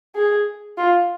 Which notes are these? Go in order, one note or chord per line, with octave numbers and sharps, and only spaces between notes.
G#4
F4